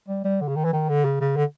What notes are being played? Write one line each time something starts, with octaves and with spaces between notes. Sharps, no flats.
G3
G3
D3
C#3
D#3
E3
D#3
D3
C#3
C#3
D3